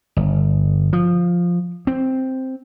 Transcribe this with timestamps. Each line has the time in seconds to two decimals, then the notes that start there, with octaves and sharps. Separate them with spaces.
0.17 G1
0.93 F3
1.87 C4